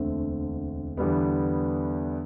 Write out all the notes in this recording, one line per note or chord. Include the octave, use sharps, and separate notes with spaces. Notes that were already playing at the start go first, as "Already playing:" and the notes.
Already playing: E1 D2 D3 A3 C4
E2 D3 G3 B3